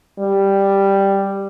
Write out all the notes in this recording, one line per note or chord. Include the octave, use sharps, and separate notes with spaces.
G3